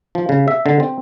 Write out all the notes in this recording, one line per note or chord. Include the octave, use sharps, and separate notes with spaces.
F3
C#3
E5
D3
C4